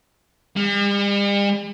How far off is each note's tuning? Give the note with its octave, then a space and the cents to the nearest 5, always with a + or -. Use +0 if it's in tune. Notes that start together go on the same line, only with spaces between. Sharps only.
G3 +45